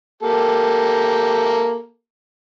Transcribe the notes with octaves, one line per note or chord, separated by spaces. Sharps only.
A#3 G4 A4